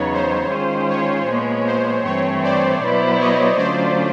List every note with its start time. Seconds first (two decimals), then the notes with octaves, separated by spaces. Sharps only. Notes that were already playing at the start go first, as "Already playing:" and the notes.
Already playing: E2 C#3 F#3 B3 D#4 C#5
0.13 C5
0.51 D#3 G#3 C#4 F4 G#4
0.89 C#5
1.28 A#2 F3 G#3 B3
1.66 C5
2.05 G2 E3 A3 C4 C#5
2.43 C5 D5
2.82 B2 F#3 B3 E4
3.20 C#5 D#5
3.58 D3 F#3 A3 C#4 F4 C5 D5